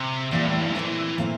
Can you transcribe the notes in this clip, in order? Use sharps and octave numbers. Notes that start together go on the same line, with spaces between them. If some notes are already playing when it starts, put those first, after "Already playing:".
Already playing: C3
E2 A#2 E3 G3
A2
G2
A#2 E3 A3 C4 E4
A#2 A3 C4 E4